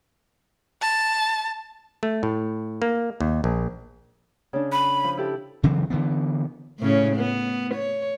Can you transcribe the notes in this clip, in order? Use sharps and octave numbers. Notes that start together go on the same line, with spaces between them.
A5
A3
A2
A#3
D#2
A#1
C#3 D4
B5
F3
E4 G4 A4
C#3 E3 F#3 C4
D3 E3 B3
A2 C#3 C#4
B3
C#5